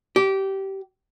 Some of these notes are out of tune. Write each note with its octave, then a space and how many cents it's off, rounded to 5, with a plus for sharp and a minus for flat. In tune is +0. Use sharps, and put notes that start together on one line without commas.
G4 -20